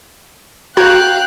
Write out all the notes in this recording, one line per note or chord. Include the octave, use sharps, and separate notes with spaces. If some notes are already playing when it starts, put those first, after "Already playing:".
F#4 F5 G5 A#5 F#6 G#6